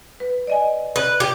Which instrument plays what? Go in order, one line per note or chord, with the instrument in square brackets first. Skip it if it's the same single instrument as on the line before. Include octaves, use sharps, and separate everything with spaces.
[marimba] B4
D5 D#5 G#5
[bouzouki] B4 [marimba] D5
[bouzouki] G4